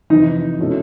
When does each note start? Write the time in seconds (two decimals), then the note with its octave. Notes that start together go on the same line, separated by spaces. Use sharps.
0.10 F2 C3 E3 D#4
0.59 B2 G#3 C#4 E4 A4